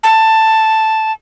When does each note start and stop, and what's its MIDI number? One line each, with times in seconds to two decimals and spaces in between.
0.03 1.12 81